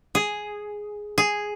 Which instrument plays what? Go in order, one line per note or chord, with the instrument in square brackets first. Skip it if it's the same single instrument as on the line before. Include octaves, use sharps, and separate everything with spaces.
[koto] G#4
G#4